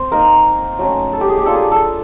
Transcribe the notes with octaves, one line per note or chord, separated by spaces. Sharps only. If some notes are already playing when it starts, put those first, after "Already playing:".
Already playing: C4 C5
A#3 D#4 A#4
F#3 A3 C#4
A4
G4
G#4
G4
A#3 D4 F4 A4
G#4
A4